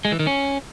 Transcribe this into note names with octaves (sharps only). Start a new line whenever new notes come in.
G#3
E3
D#3
C#4